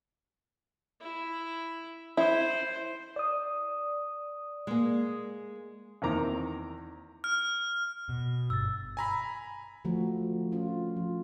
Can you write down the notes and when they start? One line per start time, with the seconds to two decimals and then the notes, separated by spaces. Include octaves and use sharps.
1.00 E4
2.17 E4 C5
3.16 D5 D#6
4.67 G#3 A#3
6.02 E2 D#3 C4 A#4 A#5 D6
7.24 F6
8.09 B2
8.50 G1 E6 A6
8.97 G#5 A#5 B5
9.85 D3 F3 A3 F#4
10.52 C#4 F4 C5
10.97 F3